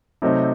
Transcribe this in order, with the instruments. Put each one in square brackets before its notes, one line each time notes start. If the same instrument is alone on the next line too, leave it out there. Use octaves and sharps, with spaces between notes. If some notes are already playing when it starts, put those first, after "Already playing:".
[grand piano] C3 F#3 A3 C4 D#4